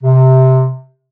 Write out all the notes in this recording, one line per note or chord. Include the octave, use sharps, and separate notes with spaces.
C3